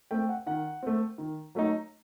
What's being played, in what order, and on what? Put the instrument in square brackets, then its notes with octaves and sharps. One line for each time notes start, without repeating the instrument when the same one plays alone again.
[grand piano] A3 C4 G5
F#5
D#3 F#5
A3 C4
D#3
F#3 A3 D#4